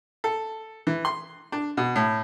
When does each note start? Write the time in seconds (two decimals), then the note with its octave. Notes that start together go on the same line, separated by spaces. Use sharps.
0.24 A4
0.87 E3
1.05 C6
1.52 D4
1.77 B2
1.96 A2